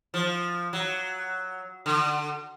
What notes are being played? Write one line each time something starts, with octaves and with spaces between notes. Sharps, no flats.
F3
F#3
D3